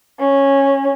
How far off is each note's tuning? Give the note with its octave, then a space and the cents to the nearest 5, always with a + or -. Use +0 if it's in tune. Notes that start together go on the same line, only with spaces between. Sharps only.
C#4 -10